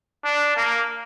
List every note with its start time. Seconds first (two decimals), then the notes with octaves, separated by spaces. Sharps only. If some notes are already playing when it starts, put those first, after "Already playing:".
0.24 D4
0.56 A#3